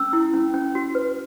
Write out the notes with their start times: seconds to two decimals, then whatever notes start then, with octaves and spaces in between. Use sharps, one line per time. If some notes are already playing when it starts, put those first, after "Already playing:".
Already playing: C#4 E6
0.13 E4
0.33 C#4
0.54 C#4
0.75 F#4
0.95 B4